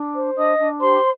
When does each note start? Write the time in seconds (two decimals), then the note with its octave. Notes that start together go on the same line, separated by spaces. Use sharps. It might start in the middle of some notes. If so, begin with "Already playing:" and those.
Already playing: D4
0.15 C5
0.37 D4 D#5 D#6
0.59 D4
0.81 G4 C5 C6